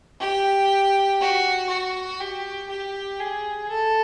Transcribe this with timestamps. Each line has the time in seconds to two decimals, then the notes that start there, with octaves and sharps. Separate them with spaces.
0.21 G4
1.20 F#4
1.69 F#4
2.20 G4
2.69 G4
3.20 G#4
3.70 A4